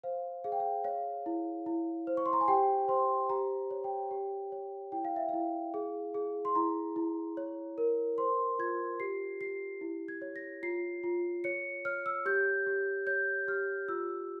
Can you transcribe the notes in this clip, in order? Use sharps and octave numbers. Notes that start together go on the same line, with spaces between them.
C5 F5
G#4 F5
G5
F5
C#5 F5
E4
E4
C5
C#6
C6
A#5
G#5
G4 G5
C5 C6
G4 A#5
C#5
G5
G4
C#5
E4 G5
F5
E5
E4 F5
G#4
G#4
C6
E4 A#5
E4
C#5
A#4
C5 C6
F4 G#6
G4 C7
G4 C7
E4
G#6
C#5
A#6
F4 C7
F4
C#5 C#7
C#5 F6
E6
G4 G6
G4
C#5 G6
G4 F6
F4 E6